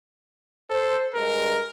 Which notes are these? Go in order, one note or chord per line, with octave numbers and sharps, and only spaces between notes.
A4 C5
G2 G#3 A#4